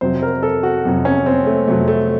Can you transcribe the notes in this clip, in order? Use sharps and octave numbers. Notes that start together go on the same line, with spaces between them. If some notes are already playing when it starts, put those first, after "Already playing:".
F2 C3 F#3 C5
A#4
A4
F#4
F2 C3 F#3
C#4
C4
A3
F2 C3 F#3 A3
A3